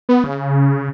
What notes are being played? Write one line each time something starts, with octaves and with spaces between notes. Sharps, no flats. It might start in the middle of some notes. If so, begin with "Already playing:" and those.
B3
C#3